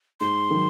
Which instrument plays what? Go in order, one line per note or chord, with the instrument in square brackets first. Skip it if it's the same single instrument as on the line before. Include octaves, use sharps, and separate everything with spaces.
[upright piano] G#2 [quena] C6
[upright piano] D#3 F#3